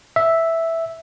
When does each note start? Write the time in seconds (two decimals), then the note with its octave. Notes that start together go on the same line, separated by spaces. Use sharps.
0.16 E5